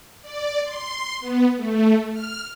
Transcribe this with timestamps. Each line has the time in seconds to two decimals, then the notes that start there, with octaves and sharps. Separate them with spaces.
0.22 D5
0.63 C6
1.20 B3
1.56 A3
2.13 F6